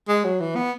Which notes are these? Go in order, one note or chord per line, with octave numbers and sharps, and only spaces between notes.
G#3
F#3
E3
B3